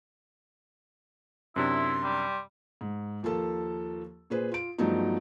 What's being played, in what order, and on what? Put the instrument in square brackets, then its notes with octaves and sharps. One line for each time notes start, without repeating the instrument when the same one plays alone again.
[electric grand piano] F#2 C3 D4 [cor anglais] E4 [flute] C6
[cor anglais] G3
[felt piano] G#2
D#2 F3 A#3 A4 A5
A#2 G#4 B4 C5
F4 D7
G2 F3 F#3 A3 B3 D#4